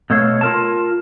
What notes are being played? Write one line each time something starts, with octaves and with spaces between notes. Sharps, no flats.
B2 A3 A4 C#5 F5
F4 A#4 A5